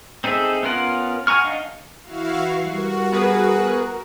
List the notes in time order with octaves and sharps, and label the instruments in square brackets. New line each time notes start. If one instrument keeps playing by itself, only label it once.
[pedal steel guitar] C4 D#4 G#4 A4 E5
B3 C#4 F4 A#4 F#5
F#5 G#5 A#5 C#6 F6
D4 D#4 D#5 F5 F#5
[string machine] E3 C#6 C7 [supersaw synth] E4 F#4 F5
[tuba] G3 [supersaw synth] F#4 [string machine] A#4
[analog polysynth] B3 G#4 B4